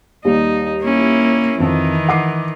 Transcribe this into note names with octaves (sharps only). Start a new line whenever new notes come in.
D#2 G3 D#4
A#3 C#4 E4
F2 D#3 E3
F#5 D6 C7